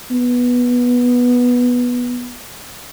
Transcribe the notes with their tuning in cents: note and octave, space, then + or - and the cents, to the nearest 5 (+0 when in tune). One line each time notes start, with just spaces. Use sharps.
B3 -10